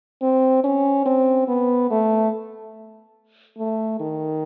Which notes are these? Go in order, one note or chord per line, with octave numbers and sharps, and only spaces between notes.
C4
C#4
C4
B3
A3
A3
D#3